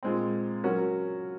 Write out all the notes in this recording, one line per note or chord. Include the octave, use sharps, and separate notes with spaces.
A#2 G#3 C4
F#3 C#4 F#4 A#4